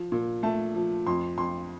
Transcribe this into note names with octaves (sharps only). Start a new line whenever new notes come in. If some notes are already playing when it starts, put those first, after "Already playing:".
Already playing: F3
A#2
A3 A5
F3
F2 C6
F2 C6